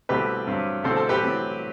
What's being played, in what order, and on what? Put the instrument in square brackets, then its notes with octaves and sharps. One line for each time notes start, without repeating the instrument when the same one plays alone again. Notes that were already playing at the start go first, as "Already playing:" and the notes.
[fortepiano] C2 B2 A3 C4 G4 B4
G2 F#3 C4
C2 B2 A3 C4 A4 C5
A4 C5
G4 B4
A2 F#3 C4